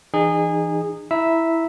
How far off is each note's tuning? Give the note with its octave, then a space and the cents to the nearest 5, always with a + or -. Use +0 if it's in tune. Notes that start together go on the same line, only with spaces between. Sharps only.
E3 +10 D#4 -35 G#4 -20
E4 +0 E5 -5 A#5 +0